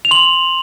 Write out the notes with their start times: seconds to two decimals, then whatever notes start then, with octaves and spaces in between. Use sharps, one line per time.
0.05 F7
0.11 C6 F#7